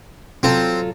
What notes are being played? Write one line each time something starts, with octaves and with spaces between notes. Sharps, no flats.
F#3 C4 F4 A4